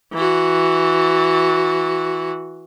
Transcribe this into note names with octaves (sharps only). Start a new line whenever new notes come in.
E3 F#4